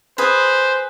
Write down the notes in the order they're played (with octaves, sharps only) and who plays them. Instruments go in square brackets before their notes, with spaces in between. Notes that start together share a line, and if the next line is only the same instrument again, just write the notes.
[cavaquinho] G#4 B4 [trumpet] C5